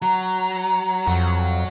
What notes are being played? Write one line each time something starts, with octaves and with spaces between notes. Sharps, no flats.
F#3 A#5
F2 F#3 F#4